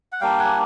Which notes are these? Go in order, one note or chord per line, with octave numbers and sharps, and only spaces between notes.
F#5
G3 A#3 D4 F5 G5
F#5 G#5